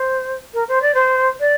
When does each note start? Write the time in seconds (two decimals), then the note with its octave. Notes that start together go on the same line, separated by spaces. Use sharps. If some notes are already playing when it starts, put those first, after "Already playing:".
Already playing: C5
0.53 A#4
0.68 C5
0.81 D5
0.94 C5
1.40 D5